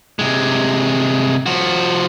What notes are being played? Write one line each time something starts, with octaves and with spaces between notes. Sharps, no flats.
C3 G#3
F3 F#4